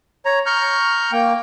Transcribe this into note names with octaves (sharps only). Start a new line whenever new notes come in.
C#5 A#5
A#5 C#6 F6 G6
A#3 G5